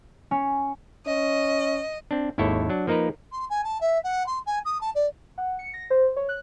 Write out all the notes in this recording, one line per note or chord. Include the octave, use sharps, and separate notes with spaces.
C#4
C#4 D#5
C4 D4
G#1 D#2 E4 A4 C#5
F#3 D4
F3 A#3 D#4 A#4 B4
C6
G#5
A5
E5
F#5
C6
G#5
D#6
A5
D5
F#5
C#7
A#6
C5
C#5
F#6